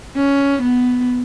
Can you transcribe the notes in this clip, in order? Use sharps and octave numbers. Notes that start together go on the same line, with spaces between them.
C#4
B3